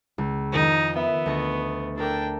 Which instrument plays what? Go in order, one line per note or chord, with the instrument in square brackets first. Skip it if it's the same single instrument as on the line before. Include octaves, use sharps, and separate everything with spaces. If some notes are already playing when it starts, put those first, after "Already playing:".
[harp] C#2
[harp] F2 D#3 [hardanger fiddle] D#4
[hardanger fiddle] B3 [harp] E5
[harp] D2 D#5 C#6
[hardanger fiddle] D4 G5 [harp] A4 A#4 D6